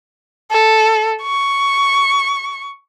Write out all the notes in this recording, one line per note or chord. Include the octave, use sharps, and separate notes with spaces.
A4
C#6